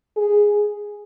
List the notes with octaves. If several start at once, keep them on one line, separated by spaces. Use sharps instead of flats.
G#4